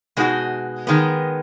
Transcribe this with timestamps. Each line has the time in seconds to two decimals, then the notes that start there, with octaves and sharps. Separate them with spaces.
0.17 B2 G#3 D#4 F#4
0.87 D#3 G#3 B3